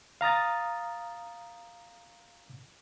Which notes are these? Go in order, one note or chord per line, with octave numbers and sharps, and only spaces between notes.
F5 A#5 D#6 A6